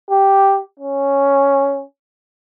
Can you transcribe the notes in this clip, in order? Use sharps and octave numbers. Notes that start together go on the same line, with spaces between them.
G4
C#4